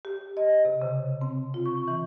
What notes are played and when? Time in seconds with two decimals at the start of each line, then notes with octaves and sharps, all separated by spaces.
0.05 G4
0.37 D#5
0.65 C3
0.82 C#3
1.21 C4
1.54 F4
1.66 C#6
1.88 E3